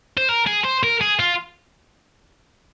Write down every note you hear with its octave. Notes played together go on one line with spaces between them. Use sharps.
C5
A#4
G#4
C5
A#4
G#4
F4